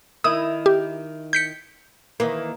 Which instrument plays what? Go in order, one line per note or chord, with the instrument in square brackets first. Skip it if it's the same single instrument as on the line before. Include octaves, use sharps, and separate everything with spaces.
[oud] D#3 E4 [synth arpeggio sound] D#6
[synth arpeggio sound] G4
G6 B6 C#7
[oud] D#3 E3 A#3